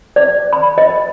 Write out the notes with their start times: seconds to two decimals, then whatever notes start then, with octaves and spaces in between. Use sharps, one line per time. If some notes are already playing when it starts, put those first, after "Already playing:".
0.16 D5
0.53 B5
0.78 D#5